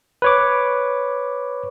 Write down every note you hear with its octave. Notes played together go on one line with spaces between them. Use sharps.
B4 C#5 D6